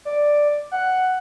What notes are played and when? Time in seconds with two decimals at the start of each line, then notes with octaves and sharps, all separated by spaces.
0.05 D5
0.71 F#5